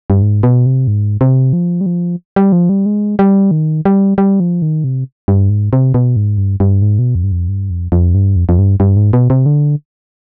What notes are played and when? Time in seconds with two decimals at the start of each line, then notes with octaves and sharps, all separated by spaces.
0.10 G2
0.22 G#2
0.43 B2
0.66 C3
0.87 G#2
1.21 C3
1.53 F3
1.81 G3
1.86 F3
2.36 G3
2.52 F3
2.69 G3
2.86 G#3
3.19 G3
3.51 D#3
3.85 G3
4.18 G3
4.40 F3
4.62 D#3
4.84 C3
5.28 G2
5.50 G#2
5.73 C3
5.94 B2
6.16 G#2
6.38 G2
6.60 G2
6.82 G#2
6.99 B2
7.15 F2
7.24 G2
7.32 F2
7.49 G2
7.70 F2
7.92 F2
8.15 G2
8.36 F2
8.49 F2
8.59 G2
8.80 G2
8.96 G#2
9.13 B2
9.30 C3
9.46 D3